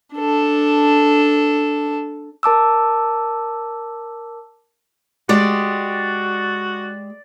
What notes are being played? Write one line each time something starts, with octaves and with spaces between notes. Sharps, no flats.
D4 A4
A#4 A5 D6 E6
G#3 F#4 G4 D5